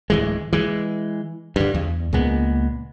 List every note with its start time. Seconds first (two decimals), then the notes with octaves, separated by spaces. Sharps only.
0.10 D1 E3 G#3
0.53 E3 G#3
1.56 G2 D3
1.74 E2
2.13 C#2 A#2 G#3 B3